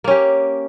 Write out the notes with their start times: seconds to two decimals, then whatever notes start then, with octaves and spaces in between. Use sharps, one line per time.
0.04 A#3
0.08 C#4
0.11 G4